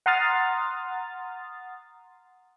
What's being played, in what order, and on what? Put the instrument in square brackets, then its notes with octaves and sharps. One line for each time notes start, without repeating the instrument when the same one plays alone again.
[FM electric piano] F#5 A#5 C6 D#6 F6 A6